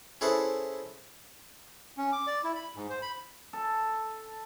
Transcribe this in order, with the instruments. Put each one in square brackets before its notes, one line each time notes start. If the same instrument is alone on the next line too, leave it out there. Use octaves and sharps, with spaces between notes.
[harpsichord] C#4 E4 G#4 A4 B4 C5
[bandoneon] C#4
D6
D5
E4
B5
G#2
C5
B5
[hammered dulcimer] A4